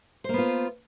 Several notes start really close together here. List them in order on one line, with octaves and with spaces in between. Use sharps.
C5 A#3 B3 F4